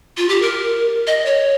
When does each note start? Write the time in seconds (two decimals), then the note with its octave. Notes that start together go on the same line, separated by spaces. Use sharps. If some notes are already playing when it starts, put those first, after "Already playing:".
0.17 F4
0.29 G4
0.42 A#4
1.07 D#5
1.26 C#5